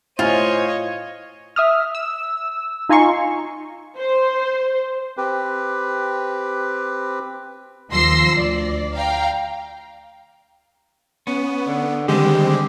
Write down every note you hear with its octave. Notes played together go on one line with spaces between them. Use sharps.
A2 F4 C5 C#5 D#5 F5 G#5
E5 D#6 F6
E6
D#4 F4 G#5 A#5 C6 C#6
C5
C4 G4 B4
D#2 F3 C6 E6 A#6 C7
D2 D5
F5 G5 A#5
B3 C#4
D3
D3 D#3 G3 G#3 C4 G4